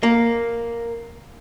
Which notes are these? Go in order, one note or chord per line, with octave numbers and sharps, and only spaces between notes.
A#3